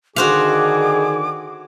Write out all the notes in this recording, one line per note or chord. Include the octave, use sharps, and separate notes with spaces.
D3 D#3 F#4 G#4 C5 F5 D6